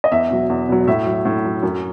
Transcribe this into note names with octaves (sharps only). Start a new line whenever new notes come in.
D#5
E2 E5
B2 F#3
E2
B2 F#3
A2 E5
F#3
A2
F#3
F#2